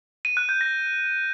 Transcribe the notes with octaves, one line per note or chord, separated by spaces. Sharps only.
D#7
F#6
G6
A#6